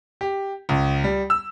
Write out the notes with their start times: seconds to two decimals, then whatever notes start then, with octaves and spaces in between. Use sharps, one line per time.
0.21 G4
0.69 C#2
1.04 G3
1.30 E6